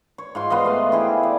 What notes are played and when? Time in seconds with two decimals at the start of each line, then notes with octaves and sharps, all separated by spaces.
0.18 C#5
0.35 G#2 F4 C6
0.50 B3 F4 C5 D#5
0.64 A3 F5
0.92 E4 G4 G#4
1.23 D5